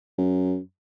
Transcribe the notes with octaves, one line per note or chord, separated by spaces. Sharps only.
F#2